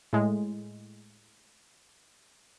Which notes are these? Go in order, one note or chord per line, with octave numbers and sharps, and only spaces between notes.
A2 G#3